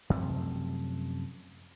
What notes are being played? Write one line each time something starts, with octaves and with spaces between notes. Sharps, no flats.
F#2 C3 F3 A3